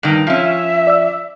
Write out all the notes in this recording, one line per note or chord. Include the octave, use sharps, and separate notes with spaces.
G2 D#3
F3 C#4 E5
D5 E6